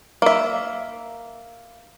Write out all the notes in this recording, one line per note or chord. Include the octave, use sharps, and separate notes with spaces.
A#3 E5